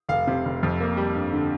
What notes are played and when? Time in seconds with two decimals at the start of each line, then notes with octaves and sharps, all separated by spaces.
0.09 F1 F5
0.27 C3
0.45 F1
0.63 F2
0.80 A#3
0.97 G3
1.15 G2
1.33 D3